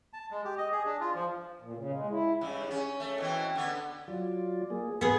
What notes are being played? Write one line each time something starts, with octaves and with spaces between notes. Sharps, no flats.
A5
G#3
G4
D#5
G#4
D4
F4
F3
A#2
C#3
G#3
E4
G2 C#3
C#4
A3
B2 E3 C4
D3 B3
F#3 F4 D5
A#3 G#4
G#2 A#3 B3 G#4